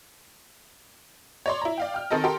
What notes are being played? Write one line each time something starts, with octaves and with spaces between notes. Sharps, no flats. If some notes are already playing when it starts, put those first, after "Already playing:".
C#5 D5 C6
E4 A#5
D5 F5 G5
G5 F6
D#3 C4 A4 A#4 D#5
G4 A4 A#4 C6